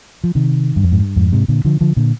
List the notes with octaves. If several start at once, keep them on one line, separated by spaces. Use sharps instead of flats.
F3
C3 D#3
G2
F2
G#2
G2
F2 G#2
G#2 C3
A#2 D3
D3 F3
D3 F3
A#2 D3